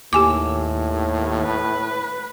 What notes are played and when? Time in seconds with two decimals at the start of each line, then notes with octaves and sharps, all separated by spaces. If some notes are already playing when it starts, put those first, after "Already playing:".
0.13 D#2 A2 G4 G#5 D6
1.43 B4